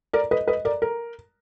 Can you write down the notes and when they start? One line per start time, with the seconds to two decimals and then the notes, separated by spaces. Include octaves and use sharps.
0.13 A#4 D5
0.31 B4 D#5
0.48 B4 D#5
0.65 A#4 D5
0.82 A#4